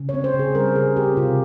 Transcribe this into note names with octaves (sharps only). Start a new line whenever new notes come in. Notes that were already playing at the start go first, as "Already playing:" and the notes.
Already playing: C#3
C#5
C4
C5
C#3
G#4
G3 A#4
C#3 G#4
C4 G4
C3 F4